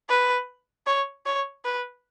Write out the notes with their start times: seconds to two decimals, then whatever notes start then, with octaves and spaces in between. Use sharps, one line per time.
0.09 B4
0.87 C#5
1.26 C#5
1.65 B4